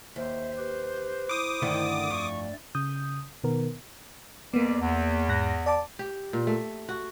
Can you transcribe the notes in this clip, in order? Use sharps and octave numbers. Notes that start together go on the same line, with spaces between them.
D#2 C5 E5
G4 B4
E4 D6 D#6
G2 D3 D#3 A3 E4 D5
F2 C#6
C#3 D#6 G6
B2 D#3 B3 A#4
F2 G3 A#3 B3 D5
E2
G#2 F#6 A#6
D5 A5 D6
G4
A#2
A3
F#4